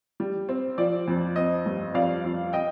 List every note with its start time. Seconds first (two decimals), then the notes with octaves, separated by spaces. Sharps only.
0.20 G3
0.49 C4
0.78 F3 D5
1.08 F2
1.36 C4 D#5
1.66 G2
1.94 F2 D5 F5
2.24 F2
2.53 D#5 G5